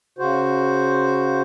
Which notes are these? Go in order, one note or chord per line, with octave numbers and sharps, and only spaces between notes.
C#3 F#4 C5